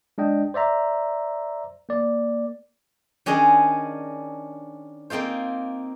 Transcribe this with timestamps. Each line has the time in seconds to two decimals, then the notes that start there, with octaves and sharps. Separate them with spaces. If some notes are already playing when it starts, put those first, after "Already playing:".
0.18 G#3 D4 D#5 G5
0.54 C5 D5 E5 A#5
1.89 A#3 D5
3.26 D#3 C#4 D4 G#4 D#5
5.10 A#3 C4 D#4 F4 C5